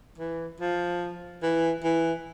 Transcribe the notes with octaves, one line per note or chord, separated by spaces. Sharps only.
E3
F3
E3
E3